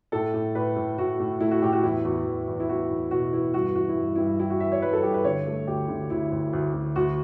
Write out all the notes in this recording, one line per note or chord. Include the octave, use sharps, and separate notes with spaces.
A2 A4
A2
A2 B4
A2
A2 F#4
A2
A3 E4
F#4
A2 G4
F#4
E2 E4
E2 F#4
E2
E2
E4
E2 F#4
E2
B2 F#4
E2 E4
G2 F#4
E3 F#4
E4
G2
G2 E4
G3 E4
F#4
E3 E5
C#5
G2 B4
A4
G2 G4
B4
D3 C#5
A3
D2 G4
D3
D2 E4
D2
D2
D2
D2 F#4